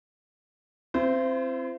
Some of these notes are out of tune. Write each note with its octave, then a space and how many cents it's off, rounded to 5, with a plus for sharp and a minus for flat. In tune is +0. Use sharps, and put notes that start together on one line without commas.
C4 +10 E4 +45 C5 -20